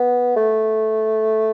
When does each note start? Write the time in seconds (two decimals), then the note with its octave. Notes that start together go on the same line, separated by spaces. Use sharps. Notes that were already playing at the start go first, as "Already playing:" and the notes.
Already playing: B3
0.36 A3